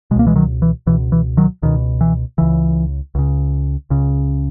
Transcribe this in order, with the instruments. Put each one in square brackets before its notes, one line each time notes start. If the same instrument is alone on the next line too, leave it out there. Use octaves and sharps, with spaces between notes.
[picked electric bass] B2 G#3
C#2 A#3
E3 G#3
D#3 F#3
E3
C#2 B2 E3
E3
D#3 F#3
C#2 B2 D#3
E3
C#2 C#3 E3
C#2 C#3
C#2 C#3